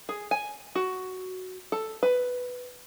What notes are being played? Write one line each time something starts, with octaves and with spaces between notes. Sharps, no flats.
G#4
G#5
F#4
A4
B4